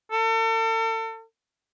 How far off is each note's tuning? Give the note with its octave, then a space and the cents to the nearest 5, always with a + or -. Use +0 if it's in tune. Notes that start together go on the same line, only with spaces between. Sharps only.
A4 +40